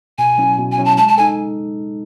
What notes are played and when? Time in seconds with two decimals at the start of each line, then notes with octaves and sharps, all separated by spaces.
0.18 B2 G#5
0.38 F#3 C#4 E4
0.58 B2
0.72 G#5
0.78 F#3 C#4 E4
0.85 A5
0.97 G#3 A5
1.08 A5
1.17 D#4 A4 G#5